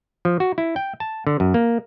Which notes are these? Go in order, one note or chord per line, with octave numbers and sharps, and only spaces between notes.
F3
F#4
E4
G5
A5
D3
F#2
A#3